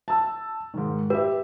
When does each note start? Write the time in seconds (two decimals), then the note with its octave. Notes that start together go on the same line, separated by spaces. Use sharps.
0.08 A5 E6
0.74 G#2 D#3
1.10 G4 B4 E5